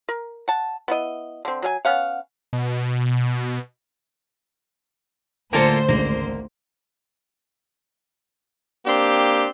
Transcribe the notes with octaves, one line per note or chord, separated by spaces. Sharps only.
A#4
F#5 A5
B3 E4 D#5
D3 C4
F#3 A#4 G#5
B3 C#4 F5 F#5
B2
D2 A2 D3 A#3 F4 A4 C5 G#5
G#1 C#2 D3 A#3
A#3 C4 D4 G4